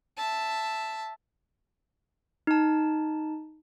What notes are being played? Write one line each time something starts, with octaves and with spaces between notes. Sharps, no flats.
E5 A5
D#4 A5